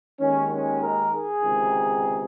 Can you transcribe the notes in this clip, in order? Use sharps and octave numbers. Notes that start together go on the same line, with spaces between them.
D#2 D#3 G#3 C#4
C#4
A#4
G#4
C#2 C3 D#3